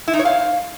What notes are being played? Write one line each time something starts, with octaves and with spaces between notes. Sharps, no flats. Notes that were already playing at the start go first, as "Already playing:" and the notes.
E4
D#4
C#5
F5